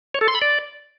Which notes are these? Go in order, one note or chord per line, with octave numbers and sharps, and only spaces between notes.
C#5
A4
C6
B5
D5